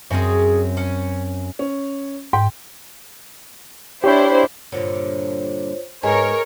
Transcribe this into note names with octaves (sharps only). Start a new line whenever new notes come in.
F#2 C4 C#4 D#4 G#4
C#4
C#4
G#2 G5
D4 E4 G4 C5 C#5 G5
G2 A#2 D3 F4 C5 C#5
G#2 B3 G#4 A#4 B4 C#5 D#5 G#5